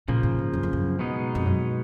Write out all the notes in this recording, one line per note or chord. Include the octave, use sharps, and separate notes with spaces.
A#2 C#3 F3 A#3
G#2
G#2
F#2
F2
F#2
B2 G#3 B3 D#4
F2
F#2